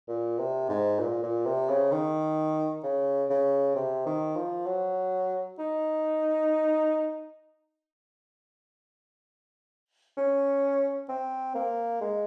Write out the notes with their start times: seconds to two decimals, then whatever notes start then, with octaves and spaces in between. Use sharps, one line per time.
0.08 A#2
0.39 C3
0.69 G#2
1.00 A#2
1.23 A#2
1.46 C3
1.69 C#3
1.91 D#3
2.83 C#3
3.30 C#3
3.75 C3
4.06 D#3
4.36 F3
4.66 F#3
5.58 D#4
10.17 C#4
11.09 C4
11.55 A#3
12.01 G#3